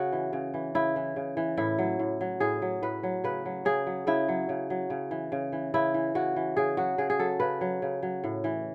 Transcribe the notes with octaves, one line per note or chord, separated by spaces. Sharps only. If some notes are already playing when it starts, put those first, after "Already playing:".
Already playing: C#3 F#4
E3
C#3
E3
C#3 E4
E3
C#3
E3
A2 E4
F#3
A2
F#3
A2 G#4
F#3
A2 B4
F#3
C#3 B4
F#3
C#3 G#4
F#3
C#3 E4
F#3
C#3
F#3
C#3
E3
C#3
E3
C#3 E4
E3
C#3 F#4
E3
C#3 G#4
F#3 F#4
C#3 G#4
G#4
F#3 A4
C#3 B4
F#3
C#3
F#3
A2
E3